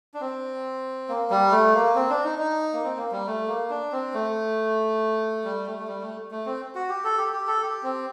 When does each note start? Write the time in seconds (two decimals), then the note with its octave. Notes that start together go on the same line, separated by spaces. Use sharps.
0.14 D4
0.21 C4
1.09 A#3
1.30 G3
1.51 A3
1.74 A#3
1.95 C4
2.09 D4
2.24 D#4
2.39 D#4
2.73 A#3
2.83 C4
2.97 A#3
3.12 G3
3.27 A3
3.48 A#3
3.70 D4
3.92 C4
4.14 A3
5.44 G3
5.66 A3
5.79 A3
5.88 G3
6.02 A3
6.31 A3
6.46 C4
6.75 F#4
6.89 G4
7.04 A4
7.18 G4
7.33 G4
7.47 A4
7.62 G4
7.83 C4